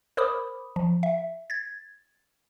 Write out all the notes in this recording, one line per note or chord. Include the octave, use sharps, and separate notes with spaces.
A#4 C5 B5 D6 D#6
F3
E5
G#6 A6